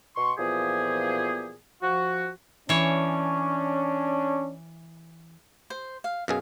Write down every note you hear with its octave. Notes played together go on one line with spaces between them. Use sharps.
B2 C6 C#6
A#2 E3 F3 B3 G4 G#4
F3 F#4
E3 C#4 D4 C#5
C5
F5
F#2 B2 G#4 F5